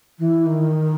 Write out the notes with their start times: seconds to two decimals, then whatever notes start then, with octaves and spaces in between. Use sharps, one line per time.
0.18 E3
0.46 D#3